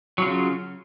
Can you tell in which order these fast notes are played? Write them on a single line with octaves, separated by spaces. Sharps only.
F#3 F4 C#3